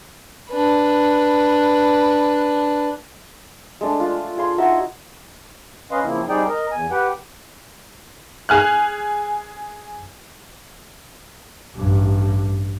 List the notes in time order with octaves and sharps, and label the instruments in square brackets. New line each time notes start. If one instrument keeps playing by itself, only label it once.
[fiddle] D4 B4
[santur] G#3 A3 D4
D4 F4
G#4 F5 C6
D#4 F#4 E5
[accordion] C#4 B4 D#5 F5 C6
C#3 F3 A#3 C4 E4
G3 C4 D#4 G#4 D5 G5
A#4 D#5
E2 G#5
G4 B4 F#5 G5
[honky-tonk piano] G#4 G#5 F6 F#6
[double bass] A1 G2